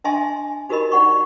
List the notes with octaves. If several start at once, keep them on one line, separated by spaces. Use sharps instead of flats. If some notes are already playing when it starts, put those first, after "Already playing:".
D4 D#5 E5 G#5 A5 C6
D#4 F#4 G4 A#4 D#5 B5
D#4 D5 F#5 C#6